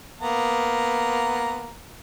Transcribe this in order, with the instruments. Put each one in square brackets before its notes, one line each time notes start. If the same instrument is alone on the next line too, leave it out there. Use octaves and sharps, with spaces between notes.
[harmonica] A#3 B3 A#5